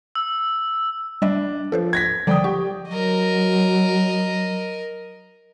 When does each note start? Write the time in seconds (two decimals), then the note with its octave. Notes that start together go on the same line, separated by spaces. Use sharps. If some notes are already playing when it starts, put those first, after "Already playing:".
0.15 E6
1.22 G3 D4 D#5 E5
1.72 F3 A4 B4 C5
1.93 G#6 A#6 B6
2.27 D3 F3 G3 D5 G5 D#6
2.44 G4 C#6
2.89 F#3 A#4 D#5